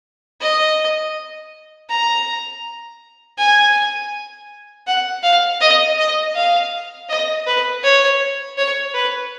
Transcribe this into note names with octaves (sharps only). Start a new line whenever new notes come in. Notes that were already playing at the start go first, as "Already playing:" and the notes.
D#5
A#5
G#5
F#5
F5
D#5
D#5
F5
D#5
B4
C#5
C#5
B4